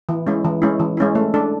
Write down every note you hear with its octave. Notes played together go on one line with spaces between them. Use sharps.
E3
G#3 C#4 E4
E3
G#3 C#4 E4
E3
G#3 C#4 E4
A3
D4 A4